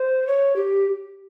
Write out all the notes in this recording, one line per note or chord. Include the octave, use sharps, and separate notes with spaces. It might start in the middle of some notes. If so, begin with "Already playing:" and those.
Already playing: C5
C#5
G4